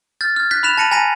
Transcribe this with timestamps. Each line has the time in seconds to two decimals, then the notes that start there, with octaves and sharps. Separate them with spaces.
0.21 F6 G6 A6
0.36 F6 G#6
0.51 F#6 G6 B6
0.63 B5 F6 F#6 B6 E7 F7
0.78 A5 A#6 C#7 D#7 F#7
0.91 G#5 A#5 A#6 B6 D#7